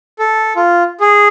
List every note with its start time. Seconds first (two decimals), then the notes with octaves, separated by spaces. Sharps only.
0.19 A4
0.56 F4
1.00 G#4